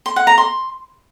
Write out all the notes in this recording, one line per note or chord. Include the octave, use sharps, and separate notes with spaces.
C6
F#5
A#5
C6